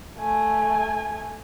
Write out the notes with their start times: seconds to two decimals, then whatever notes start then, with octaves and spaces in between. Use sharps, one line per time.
0.19 A3 G#5